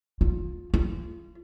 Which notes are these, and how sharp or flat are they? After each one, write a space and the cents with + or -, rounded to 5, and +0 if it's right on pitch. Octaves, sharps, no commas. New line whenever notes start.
F4 +20
F4 -35